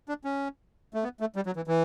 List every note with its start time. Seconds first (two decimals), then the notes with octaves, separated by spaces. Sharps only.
0.09 D4
0.24 C#4
0.94 A3
1.04 B3
1.20 A3
1.36 G3
1.46 F#3
1.56 E3
1.68 E3